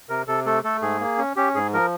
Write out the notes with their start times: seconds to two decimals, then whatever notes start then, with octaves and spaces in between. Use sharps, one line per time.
0.09 C3 A#4
0.27 C3 A4
0.46 A3 A4
0.64 A3 A4
0.82 G#2 G#4
1.00 A#3
1.18 C#4
1.36 C#4 G4
1.55 G#2 G#4
1.73 F3 A#4